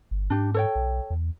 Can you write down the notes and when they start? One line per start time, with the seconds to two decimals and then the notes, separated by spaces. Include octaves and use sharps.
0.11 G1
0.30 G#2 D4 G4
0.54 A4 C#5 G5
0.75 B1
1.10 E2